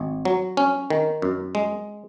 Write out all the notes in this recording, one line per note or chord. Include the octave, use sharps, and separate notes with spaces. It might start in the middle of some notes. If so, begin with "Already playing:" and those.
Already playing: G#1
F#3
C#4
D#3
F#2
G#3